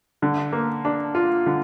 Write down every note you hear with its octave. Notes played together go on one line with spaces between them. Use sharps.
D3
A#3
D4
F4
D3